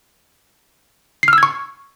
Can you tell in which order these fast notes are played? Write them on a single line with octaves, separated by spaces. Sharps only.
C7 F6 E6 G#6 C#6